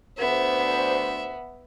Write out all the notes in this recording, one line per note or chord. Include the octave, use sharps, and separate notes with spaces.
D2 B3 C5 E5